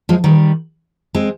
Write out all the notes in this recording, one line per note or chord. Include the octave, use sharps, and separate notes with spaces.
F3 G#3
D#3 G3
G#3 C4